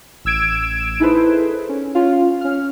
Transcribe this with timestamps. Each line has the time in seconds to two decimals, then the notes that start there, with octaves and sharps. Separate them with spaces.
0.25 A1 E6 G#6 D7 E7
1.00 D#4 E4 G#4 A4 B4 C5
1.69 C#4
1.95 C#4 F4 F5
2.41 C#4 F6